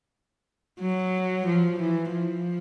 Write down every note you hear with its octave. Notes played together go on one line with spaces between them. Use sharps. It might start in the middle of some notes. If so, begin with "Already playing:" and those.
F#3
F3
E3
F3